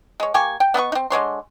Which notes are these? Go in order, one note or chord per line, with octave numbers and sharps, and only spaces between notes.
G#3 C#5
A#3 G4 G#5 C#6
G5
B3 D#5 F5 C#6
C4 D#4
D3 G#3 C#5 C6